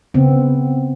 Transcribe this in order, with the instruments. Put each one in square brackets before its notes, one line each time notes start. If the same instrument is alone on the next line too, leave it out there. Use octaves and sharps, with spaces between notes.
[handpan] C#3 B3 C4